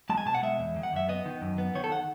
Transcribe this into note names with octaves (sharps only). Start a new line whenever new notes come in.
G#3 A5
G#5
B2 A5
F#5
G#3 E5
E2
D#3
F#5
F#2 E5
B3 D#5
D#3
F#2
B3
D#3 C#5
A4
F#5